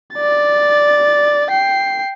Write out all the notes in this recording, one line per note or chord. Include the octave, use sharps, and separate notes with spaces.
D5 A6
G5 C7